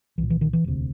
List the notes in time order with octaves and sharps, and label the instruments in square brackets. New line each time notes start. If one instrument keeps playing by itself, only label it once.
[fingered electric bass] C2 E3
A#2
E3
D#3
E3
E1 D2 C3